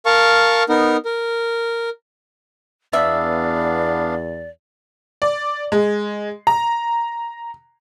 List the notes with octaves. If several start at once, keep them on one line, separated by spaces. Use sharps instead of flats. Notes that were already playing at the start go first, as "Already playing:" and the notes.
A#4 F5 A5 C#6
B3 D#4 A#4
A#4
E2 B3 D4 D5 E5 F5
D5
G#3
A#5